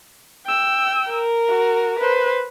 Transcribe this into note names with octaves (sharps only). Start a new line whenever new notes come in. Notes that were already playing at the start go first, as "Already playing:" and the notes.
G5 E6
A#4
F#4
B4 C5